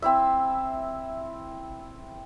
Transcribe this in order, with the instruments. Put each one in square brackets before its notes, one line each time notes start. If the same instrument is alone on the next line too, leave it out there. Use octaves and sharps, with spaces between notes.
[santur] C4 E4 E5